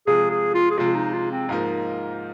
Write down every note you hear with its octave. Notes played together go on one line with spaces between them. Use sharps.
C3 F3 G#3 G#4
G#4
F4
G#4
C3 F3 G#3 F4
D#4
F4
C4
G#2 F3 A#3 D#4 A#4